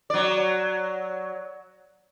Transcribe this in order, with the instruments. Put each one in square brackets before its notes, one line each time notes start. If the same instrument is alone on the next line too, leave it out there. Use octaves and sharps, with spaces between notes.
[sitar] F#3 D5